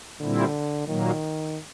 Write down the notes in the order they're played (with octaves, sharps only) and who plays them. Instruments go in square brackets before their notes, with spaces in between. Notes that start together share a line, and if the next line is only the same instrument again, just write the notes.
[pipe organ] A#2 G3 C4 E4 [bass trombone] D3
[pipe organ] A#2 F#3 A#3 [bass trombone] D#3